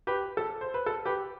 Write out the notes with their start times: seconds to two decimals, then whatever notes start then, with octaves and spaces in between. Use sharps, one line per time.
0.07 G4 B4
0.37 A4
0.61 C5
0.74 B4
0.86 A4
1.05 G4 B4